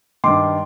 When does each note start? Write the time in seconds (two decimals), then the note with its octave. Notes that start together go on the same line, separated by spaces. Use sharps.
0.24 G2 D#3 C6 D6